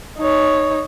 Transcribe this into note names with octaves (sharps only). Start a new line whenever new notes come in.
D#4 C#5